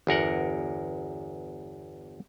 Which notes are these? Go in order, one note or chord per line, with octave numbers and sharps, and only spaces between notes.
G1 E2 A#4 F#5